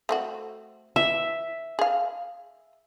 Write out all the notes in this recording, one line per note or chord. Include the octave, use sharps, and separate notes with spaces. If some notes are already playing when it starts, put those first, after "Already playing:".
A3 C4 F#4
E3 E5
G#4 F5